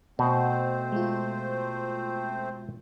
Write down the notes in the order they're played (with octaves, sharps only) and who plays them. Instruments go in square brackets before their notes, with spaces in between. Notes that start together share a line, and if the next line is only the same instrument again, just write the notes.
[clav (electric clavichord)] B2 [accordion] A3 C4 C5
[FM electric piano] G#3 F4